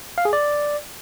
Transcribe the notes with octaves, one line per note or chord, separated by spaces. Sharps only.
F5
G#4
D5